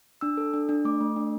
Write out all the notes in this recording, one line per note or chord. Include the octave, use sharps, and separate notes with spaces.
D4 E6
A4
D4
D4
A3 D6
A3
D4